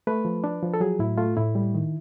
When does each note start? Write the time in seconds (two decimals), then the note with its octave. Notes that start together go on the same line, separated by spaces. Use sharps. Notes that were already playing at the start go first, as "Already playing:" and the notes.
0.07 A3 B4
0.25 F3
0.44 D4
0.63 F3
0.74 A4
0.80 F#3 G#4
0.99 A2 E4
1.18 A3 F4
1.37 A2 E4
1.55 G3
1.74 D#3